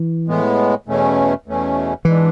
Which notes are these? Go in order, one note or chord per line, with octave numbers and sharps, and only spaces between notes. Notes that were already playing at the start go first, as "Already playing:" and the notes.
Already playing: E3
A2 G#3 B3
E2 B2 A3 C#4
E2 B2 A3 C#4
G#2 E3 G#3 D4